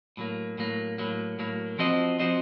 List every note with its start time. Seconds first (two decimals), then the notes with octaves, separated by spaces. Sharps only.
0.17 A2 F#3 A#3
0.58 A2 F#3 A#3
0.98 A2 F#3 A#3
1.39 A2 F#3 A#3
1.79 F3 C4 F#4 C5 D#5
2.19 F3 C4 F#4 C5 D#5